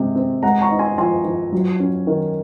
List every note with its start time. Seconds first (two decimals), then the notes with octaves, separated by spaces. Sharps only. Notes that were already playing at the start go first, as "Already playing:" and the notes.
Already playing: C3 G#3
0.15 C4
0.43 G#3 F#5 A#5
0.61 A#5 C#6
0.71 D#4
0.79 G#5 C6
0.98 F3 G#5 C6
1.24 F3
1.52 F#3
1.80 C#4
2.07 D#3